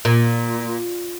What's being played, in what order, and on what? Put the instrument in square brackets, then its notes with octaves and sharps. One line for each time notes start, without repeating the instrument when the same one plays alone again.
[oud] A#2